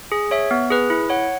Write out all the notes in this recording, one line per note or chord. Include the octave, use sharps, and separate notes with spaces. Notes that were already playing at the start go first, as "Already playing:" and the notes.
G#4
C#5 E5
B3
G#4 B4
E4
C#5 F#5